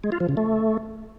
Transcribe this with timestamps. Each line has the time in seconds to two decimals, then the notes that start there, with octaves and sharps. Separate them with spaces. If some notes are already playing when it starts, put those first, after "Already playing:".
0.04 G#3
0.12 F4
0.20 F3
0.29 C#3
0.37 A3